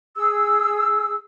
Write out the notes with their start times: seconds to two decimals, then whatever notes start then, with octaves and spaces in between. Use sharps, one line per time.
0.17 G#4 E6